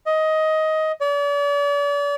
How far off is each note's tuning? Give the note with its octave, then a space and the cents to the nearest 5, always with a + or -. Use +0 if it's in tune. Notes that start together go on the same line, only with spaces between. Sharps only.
D#5 +15
D5 -40